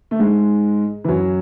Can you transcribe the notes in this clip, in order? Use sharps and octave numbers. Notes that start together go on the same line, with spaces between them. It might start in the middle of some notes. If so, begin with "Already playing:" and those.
A3
G#2 G#3
E3
F#2 F#3